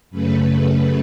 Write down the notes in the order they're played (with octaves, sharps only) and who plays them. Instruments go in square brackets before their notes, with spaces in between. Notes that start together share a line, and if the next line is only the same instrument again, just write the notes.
[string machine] F#2 C#3 A3 B4